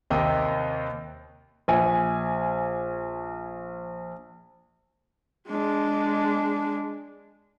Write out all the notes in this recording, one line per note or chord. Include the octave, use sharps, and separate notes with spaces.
D#2 C3 A#3 G4 D#5 G5
A#1 G#5
G#3 D4